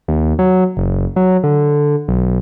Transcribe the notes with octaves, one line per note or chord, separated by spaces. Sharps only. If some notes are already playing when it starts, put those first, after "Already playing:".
D#2
F#3
F#1
F#3
D3
B1